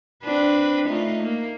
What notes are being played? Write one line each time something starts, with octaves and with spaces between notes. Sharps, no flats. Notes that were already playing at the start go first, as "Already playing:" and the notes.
C4 D4 B4
A3 D#4 F4
A#3